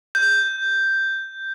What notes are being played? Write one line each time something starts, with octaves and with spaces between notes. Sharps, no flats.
G6